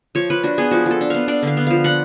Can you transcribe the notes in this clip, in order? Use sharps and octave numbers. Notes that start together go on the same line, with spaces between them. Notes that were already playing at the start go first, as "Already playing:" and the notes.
F3 C#5
F3 B4
D4 F#4
B3 G#4
F3 F#4
F3
A4
D4
B3 F5
D4 D5
D3 F5
B3
F3 F5
D4 F#5